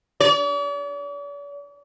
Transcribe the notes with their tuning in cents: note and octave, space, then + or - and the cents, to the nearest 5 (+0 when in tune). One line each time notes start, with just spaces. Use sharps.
D5 -45